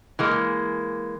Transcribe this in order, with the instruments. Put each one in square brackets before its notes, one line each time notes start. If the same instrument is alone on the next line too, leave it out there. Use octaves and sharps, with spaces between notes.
[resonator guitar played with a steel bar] E3 G#3 A#3